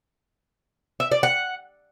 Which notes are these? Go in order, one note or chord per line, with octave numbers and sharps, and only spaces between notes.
E5
D5
F#5